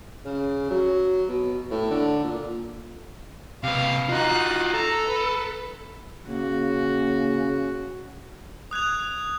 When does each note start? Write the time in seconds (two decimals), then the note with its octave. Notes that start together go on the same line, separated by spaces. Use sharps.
0.25 C#3
0.71 F#3
1.29 B2
1.71 A2
1.91 D3
2.23 A#2
3.64 C3 B4 F5
4.09 D#4 F4 F#4 F#6
4.74 A4 A#5
5.08 B4
6.27 C#3 A#3 F#4
8.71 D#6 F#6 G#6 F7